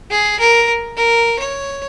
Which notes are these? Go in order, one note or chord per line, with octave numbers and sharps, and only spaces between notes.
G#4
A#4
A#4
C#5